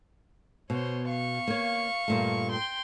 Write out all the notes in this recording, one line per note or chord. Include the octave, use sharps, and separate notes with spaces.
B2 C5 C#5
F5 C#6
A#3 C#5
G2 A#2 A3
G5 C6